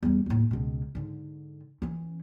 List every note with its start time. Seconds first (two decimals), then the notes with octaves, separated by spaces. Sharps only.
0.03 E2 G3
0.26 D#2 A2
0.51 C#2 B2
0.95 G#2 D3
1.82 E3 C#4